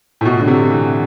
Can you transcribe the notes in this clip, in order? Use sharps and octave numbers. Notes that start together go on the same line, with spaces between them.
A2
B2
D3
C3
E3